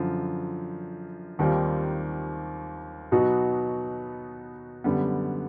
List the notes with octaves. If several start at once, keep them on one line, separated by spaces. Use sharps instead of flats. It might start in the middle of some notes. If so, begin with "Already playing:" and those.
Already playing: F#2 D3 F3
D#2 D#3 G3 C4 F4
B2 F#3 B3 D#4 F#4
F#2 D3 G3 B3